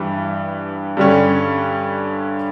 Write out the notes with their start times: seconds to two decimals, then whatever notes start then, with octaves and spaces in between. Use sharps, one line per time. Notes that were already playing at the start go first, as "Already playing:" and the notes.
Already playing: G2 E3 G3
0.97 G2 D3 G3 C#4